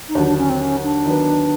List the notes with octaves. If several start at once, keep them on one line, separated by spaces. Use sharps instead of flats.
D#4
D#2 D3 F#3 D4
D4
C#4
C4
C#4
D4
D#3 F#3 B3